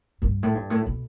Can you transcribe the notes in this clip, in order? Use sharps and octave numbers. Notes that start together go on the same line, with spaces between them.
G2
A2
G2
A2
B2